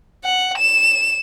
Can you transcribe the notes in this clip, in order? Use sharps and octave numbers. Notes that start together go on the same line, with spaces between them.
F#5
E7